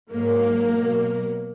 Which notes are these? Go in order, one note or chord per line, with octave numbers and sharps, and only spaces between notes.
G#2 F#3 A#3
B2 F#3